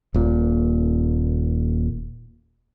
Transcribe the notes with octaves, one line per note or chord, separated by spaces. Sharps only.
D#1 A#2